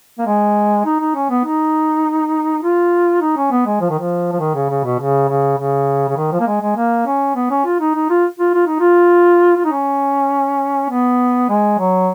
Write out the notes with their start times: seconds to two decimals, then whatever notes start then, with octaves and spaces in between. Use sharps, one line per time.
0.18 A#3
0.26 G#3
0.85 D#4
1.00 D#4
1.15 C#4
1.30 B3
1.45 D#4
2.63 F4
3.22 D#4
3.37 C#4
3.51 B3
3.66 G#3
3.81 F3
3.90 D#3
3.99 F3
4.32 F3
4.40 D#3
4.55 C#3
4.70 C#3
4.84 B2
5.00 C#3
5.29 C#3
5.58 C#3
6.08 C#3
6.17 D#3
6.32 F3
6.40 A#3
6.47 G#3
6.62 G#3
6.77 A#3
7.06 C#4
7.36 B3
7.50 C#4
7.65 F4
7.80 D#4
7.95 D#4
8.10 F4
8.39 F4
8.54 F4
8.66 D#4
8.79 F4
9.56 F4
9.65 D#4
9.72 C#4
10.90 B3
11.49 G#3
11.79 F#3